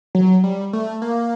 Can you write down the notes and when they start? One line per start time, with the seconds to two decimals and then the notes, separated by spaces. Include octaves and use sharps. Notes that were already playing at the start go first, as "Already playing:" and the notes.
0.15 F#3
0.44 G3
0.73 A3
1.02 A#3